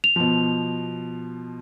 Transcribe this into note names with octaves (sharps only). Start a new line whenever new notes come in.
F7
B2 F3